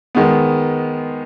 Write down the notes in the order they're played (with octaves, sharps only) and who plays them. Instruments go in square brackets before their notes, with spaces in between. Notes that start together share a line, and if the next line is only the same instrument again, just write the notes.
[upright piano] D#3 G#3 B3